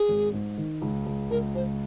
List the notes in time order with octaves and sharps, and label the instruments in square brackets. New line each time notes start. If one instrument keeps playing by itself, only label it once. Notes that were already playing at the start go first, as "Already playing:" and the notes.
Already playing: [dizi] G#4
[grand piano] G#1
G#2
D#3
C#2
C#2
[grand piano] C#2 [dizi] A#4
[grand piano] C#2 [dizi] C5